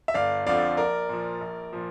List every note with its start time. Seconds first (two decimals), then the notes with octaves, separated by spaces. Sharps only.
0.08 E5
0.14 G1 D5 F5
0.47 F2 D3 F3 D5 F5
0.77 A#1 A#4 D5
1.09 A#2 F3
1.41 A#1
1.73 A#2 F3